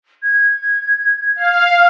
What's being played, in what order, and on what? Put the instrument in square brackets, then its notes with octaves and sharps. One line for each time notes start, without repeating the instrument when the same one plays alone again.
[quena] G#6
[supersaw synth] F5